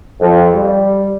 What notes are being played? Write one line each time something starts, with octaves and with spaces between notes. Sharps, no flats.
F2
G3